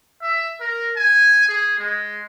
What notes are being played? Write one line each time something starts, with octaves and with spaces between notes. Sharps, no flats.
E5
A#4
G#5
G#4
G#3